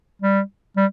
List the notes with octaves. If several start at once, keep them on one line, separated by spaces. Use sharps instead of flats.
G3
G3